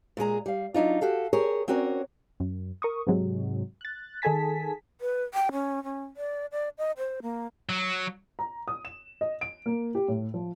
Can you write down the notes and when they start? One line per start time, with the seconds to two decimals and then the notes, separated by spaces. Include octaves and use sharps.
0.17 A#2 G#3 G#4 A#5
0.46 G3 F5
0.74 F#3 D4 D#4 F4
1.01 F#4 G4 A4 F5
1.33 G4 G#4 A#4 C#5
1.68 C4 C#4 F#4 A#4 C#5 D5
2.40 F#2
2.82 A#4 C#6 D#6
3.07 G#2 C3 F#3 G#3
3.81 F#6 A6
4.22 D#3 G#4 A4 G#5 A5 B6
5.01 B4
5.34 G5
5.52 C#4
5.84 C#4
6.17 D5
6.52 D5
6.78 D#5
6.97 C5
7.22 A#3
7.69 F#3
8.39 A#5
8.68 D#6
8.85 E7
9.21 D#5
9.41 D7
9.66 A#3
9.95 G4
10.08 A2
10.34 F3